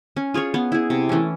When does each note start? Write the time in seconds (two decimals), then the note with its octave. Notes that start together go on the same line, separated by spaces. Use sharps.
0.17 C#4
0.34 F4 G#4 C#5
0.54 B3
0.72 E4 G#4
0.90 C3
1.09 E3 A3 C#4